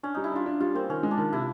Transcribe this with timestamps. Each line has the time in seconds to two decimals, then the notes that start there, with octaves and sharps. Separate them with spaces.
0.03 C#4 D4
0.14 G3 D#4
0.24 E4
0.32 D4 F4
0.46 D4
0.60 G3 F4
0.75 A#3 C4
0.89 D#3 C#4
1.03 G#3
1.11 D4
1.17 D#3
1.32 C3 E4